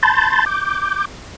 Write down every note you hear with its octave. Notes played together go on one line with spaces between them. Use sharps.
A5 B5 C6 G6 A6
D6 G6